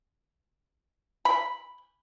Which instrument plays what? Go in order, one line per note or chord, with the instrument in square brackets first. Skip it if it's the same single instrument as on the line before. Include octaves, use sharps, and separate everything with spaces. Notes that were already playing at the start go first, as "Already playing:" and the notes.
[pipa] B5